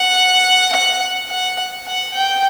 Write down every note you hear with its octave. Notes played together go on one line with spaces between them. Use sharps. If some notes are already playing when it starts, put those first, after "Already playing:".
Already playing: F#5
F#5
F#5
F#5
G5